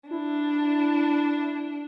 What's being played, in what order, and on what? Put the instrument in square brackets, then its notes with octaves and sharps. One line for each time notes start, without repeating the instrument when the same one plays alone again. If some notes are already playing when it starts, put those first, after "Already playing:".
[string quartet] D4 [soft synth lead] E4